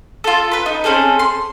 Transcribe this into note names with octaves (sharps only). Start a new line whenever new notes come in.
F4 A4
B4 B5
D#4
C4 C#4 G#4 A4
C6